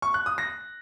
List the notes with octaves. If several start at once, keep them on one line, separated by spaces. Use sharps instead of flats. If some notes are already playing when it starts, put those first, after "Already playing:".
C#6
F#6
D#6
A#6